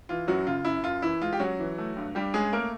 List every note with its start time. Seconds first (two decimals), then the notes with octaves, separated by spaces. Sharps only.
0.09 E3 F4
0.28 F#2 F#3 F#4
0.47 C#3 F4
0.65 F#2 E4
0.83 F#2 F4
1.02 E3 E4
1.21 G#3 F4
1.33 G4
1.40 F#3 C#4 F#4
1.59 E3
1.78 A3
1.97 G2
2.15 G2 G3 G4
2.34 G#3 C#4 G#4
2.52 A3 A#3 A#4